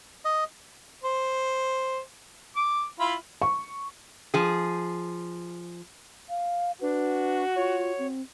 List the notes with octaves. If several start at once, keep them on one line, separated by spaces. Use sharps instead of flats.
D#5
C5
D6
E4 F4 B5
C#6
F3 G#4
F5
D4 F#4 B4
F4 C#5
C4